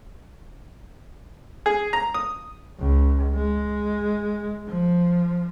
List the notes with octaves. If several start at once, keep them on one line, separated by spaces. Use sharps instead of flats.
G#4
A#5
D#6
C#2
G#3
F3